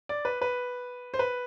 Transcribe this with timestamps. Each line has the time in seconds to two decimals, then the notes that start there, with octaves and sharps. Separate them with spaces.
0.09 D5
0.25 B4
0.42 B4
1.14 C5
1.19 B4